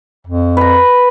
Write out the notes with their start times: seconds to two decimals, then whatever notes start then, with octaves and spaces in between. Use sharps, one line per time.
0.27 F2
0.57 B4 A#5